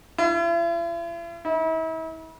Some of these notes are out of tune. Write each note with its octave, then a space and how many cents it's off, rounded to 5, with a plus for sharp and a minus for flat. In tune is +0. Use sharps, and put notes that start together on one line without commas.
E4 +45
E4 -40